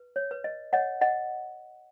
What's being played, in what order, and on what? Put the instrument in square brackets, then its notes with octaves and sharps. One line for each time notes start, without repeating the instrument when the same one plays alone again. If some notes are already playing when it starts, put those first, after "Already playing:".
Already playing: [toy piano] B4
C#5
B4
D#5
C#5 D#5 F#5
D#5 F#5